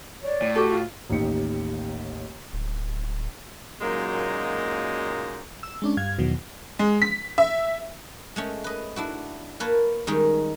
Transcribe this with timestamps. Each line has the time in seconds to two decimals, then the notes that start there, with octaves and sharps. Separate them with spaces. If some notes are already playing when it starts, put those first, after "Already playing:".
0.23 C#5 D5
0.42 A2
0.55 F#4 G4 A4
0.69 F4
1.09 A1 D#2 D#4 G4 C#7
2.53 D1
3.81 F#2 A#2 F#3 G#3 A#3 D#4
5.63 E6
5.82 G#3 C#4 D4
5.97 G2 F5 G#6
6.18 E2 B2 D#3 F#3
6.79 G#3
7.02 B6
7.38 E5
8.36 G#3 A3 C#4
8.64 B4 D#5
8.96 D4 E4 F#4
9.60 A#3 A#4 B4 C#5 A5
10.07 D#3 G3 G#3 C#4 D#4